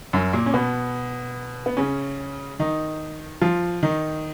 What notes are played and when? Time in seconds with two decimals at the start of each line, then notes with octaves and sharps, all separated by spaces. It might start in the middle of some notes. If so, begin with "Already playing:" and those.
0.13 F#2 F#3
0.33 A#2 A#3
0.46 C#4
0.54 B2 B3
1.66 B3
1.77 C#3 C#4
2.59 D#3 D#4
3.41 F3 F4
3.83 D#3 D#4